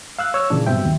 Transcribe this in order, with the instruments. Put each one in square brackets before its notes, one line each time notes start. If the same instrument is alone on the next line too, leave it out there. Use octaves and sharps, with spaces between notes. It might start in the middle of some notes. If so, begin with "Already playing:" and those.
[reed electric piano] F5 E6 F#6
C#5 E6
A#2 C#3 E3 D4
G2 B2 C4 E5 G5
D#2